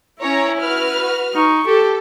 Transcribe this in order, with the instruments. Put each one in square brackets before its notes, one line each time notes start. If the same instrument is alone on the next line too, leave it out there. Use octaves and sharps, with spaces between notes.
[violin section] C#4 C#5 A#5 [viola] E4
[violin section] F#4 B4 F6
[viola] D#4 C#6
[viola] G4 [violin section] A4